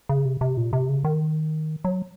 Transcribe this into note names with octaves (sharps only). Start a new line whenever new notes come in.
C#3
C3
C3
A#2
C3
C#3
D#3
F#3